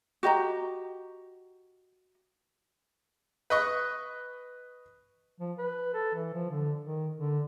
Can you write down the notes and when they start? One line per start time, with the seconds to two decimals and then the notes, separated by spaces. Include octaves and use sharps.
0.23 F#4 G4 D#5 A#5
3.50 B4 D#5 C#6
5.40 F3
5.58 B4
5.94 A4
6.14 E3
6.33 F3
6.50 D3
6.82 D#3
7.16 D3